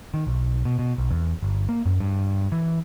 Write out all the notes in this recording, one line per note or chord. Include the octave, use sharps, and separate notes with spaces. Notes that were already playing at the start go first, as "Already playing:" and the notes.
D#3
B1
B2
B2
B1
E2
G1
A#3
F#2
G2
E3